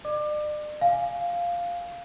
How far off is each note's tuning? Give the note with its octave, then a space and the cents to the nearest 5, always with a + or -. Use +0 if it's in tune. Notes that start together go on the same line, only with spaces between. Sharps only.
D5 +40 D6 +25
F5 +0 G#5 +0